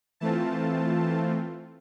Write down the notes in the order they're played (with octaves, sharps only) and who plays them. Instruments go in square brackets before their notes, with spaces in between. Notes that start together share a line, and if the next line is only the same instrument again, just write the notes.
[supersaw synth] E3 A3 C4 F4 A5